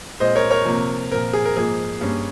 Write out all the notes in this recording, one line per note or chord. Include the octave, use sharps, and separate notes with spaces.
A#2 G#3 C4 C5 D#5
A#4 C#5
A#4 C#5
C3 F3 A#3
A#2 F3 C4 A#4
G#4
A#4
G#2 F3 A#3 G#4
G2 G3 A#3 C#4